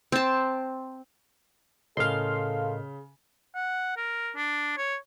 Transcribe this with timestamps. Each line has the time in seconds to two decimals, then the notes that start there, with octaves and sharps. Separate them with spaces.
0.12 C4 A5
1.97 A2 C#3 A4 A#4 D#5 F5 C6 F6
3.55 F#5
3.97 A#4
4.36 D4
4.77 C#5